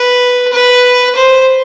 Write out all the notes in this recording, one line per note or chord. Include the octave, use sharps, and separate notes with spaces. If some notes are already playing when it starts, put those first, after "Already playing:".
Already playing: B4
B4
C5